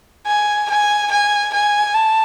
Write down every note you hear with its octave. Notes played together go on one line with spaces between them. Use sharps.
G#5
G#5
G#5
G#5
A5